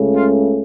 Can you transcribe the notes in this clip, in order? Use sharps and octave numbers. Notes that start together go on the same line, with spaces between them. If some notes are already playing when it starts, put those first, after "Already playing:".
Already playing: C#2 C#3 A3
F4